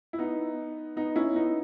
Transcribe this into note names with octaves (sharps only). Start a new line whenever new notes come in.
E4
B3 D#4
B3 D#4
C#4 E4
B3 D#4